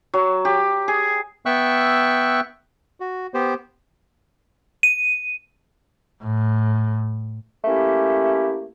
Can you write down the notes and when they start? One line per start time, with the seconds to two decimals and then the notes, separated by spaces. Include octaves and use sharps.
0.14 F#3
0.45 G4
0.88 G#4
1.46 B3 E5 G5 C#6 E6 F#6
3.00 F#4
3.34 B3 G4 C5
4.83 D#7
6.23 A2
7.65 A3 A#3 C#4 E4 G4